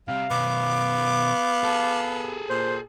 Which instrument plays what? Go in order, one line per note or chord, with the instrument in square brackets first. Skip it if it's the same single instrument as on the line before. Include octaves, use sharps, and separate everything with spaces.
[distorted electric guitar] C3 [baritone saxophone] G3 [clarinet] F5
[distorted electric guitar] B2 D#3 [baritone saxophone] B3 [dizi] D6
[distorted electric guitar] G#4 A4
[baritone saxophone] A#2 [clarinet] C5